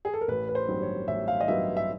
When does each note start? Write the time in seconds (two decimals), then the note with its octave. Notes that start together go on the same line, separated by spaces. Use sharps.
0.05 G#4
0.14 A4
0.21 A#4
0.28 A1 B4
0.49 B4
0.55 C5
0.68 G2 D#3 F#3 B3
0.82 C#5
1.08 A1 E5
1.28 F5
1.41 D#5
1.48 G2 D#3 F#3 B3 E5
1.77 E5